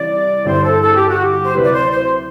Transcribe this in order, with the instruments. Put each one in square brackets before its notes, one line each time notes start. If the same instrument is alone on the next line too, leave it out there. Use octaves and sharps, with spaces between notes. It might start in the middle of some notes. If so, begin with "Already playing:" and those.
Already playing: [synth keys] C3 E3 G3 C4 E4 [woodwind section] D5
[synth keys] G2 D3 G3 C4 E4 [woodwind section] C5
[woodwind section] A4
A4
G4
F#4
G4
C5
[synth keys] D2 C3 F#3 C4 E4 [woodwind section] B4
[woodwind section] D5
C5
C5